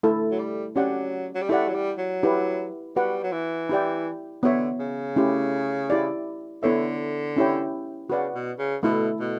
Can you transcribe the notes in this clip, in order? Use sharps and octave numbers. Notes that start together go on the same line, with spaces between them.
A3 E4 A4
F#3
G3
F#3 C#4 G4 D5 F#5
F#3
G3
A3 E4 G4 D5 F#5
F#3
G3
F#3
E4 G4 B4 F#5
G3 F#4 B4 F#5
F#3
E3
E4 G4 D5 G5
D3 B3 F#4 C#5 E5
C#3
A3 C#4 E4 G4
E4 G4 D5
D3 B3 E4 A4 C#5 E5
C#4 E4 G4 C#5 G5
C#3 F#4 B4 D5 F#5
B2
C#3
B2 A3 E4 A4
B2